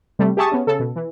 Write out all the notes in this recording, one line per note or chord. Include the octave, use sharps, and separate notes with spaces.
C3 G3 A3
G4 G#4 E5 A5 C#6 D#6
B3 C#4
C#3 A4
B2
E3